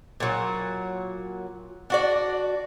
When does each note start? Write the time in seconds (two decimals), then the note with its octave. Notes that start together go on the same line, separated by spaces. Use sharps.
0.20 A#2 F#3
1.90 D4 F#4 D5